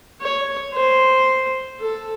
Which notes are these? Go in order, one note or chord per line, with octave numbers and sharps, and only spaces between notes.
C#5
C5
A4